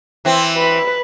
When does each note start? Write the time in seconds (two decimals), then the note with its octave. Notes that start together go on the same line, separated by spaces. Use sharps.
0.25 E3 C4
0.57 B4